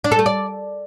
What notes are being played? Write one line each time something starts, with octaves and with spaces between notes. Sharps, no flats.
D4
A4
A3
D5